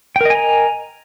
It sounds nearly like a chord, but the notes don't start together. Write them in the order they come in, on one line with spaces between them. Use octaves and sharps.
G5 A#4 D#5 G#5 A#5